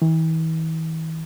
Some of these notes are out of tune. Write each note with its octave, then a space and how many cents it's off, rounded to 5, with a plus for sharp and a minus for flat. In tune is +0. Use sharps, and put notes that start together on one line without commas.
E3 -40